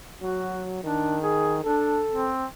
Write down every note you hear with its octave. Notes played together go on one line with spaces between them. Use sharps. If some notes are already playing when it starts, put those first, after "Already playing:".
F#3 F#4
D#3 D4
G#4
D4 A4
C4